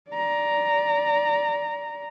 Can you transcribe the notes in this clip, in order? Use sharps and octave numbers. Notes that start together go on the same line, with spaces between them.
D5 A#5